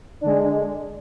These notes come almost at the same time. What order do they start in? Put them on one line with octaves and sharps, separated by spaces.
D4 D3 G#3